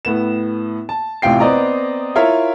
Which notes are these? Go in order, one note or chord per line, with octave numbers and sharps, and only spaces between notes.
A2 B3 E7
A5
A1 C3 F4 G5 C7
B3 C4 D5 D#5 A#5
E4 F4 A#4 C#5 E5 F5